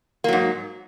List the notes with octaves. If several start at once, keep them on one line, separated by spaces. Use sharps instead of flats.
G#2 F#3 A#3